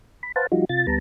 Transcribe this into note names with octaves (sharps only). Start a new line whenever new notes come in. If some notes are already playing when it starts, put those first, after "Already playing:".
B5
B4 C5 F5 F#5 A5
F3 G3 D#4 F4 F#4
C3 F4 A6
D2 G3 B3 A5 A#5